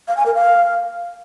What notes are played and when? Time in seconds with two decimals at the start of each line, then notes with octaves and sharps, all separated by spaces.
0.08 F5
0.17 G#5
0.26 A#4
0.35 F5